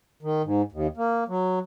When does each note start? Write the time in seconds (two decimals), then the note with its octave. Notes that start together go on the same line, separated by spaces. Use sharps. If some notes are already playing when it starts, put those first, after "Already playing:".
0.23 D#3
0.44 G#2
0.72 D#2
0.97 A#3
1.28 F#3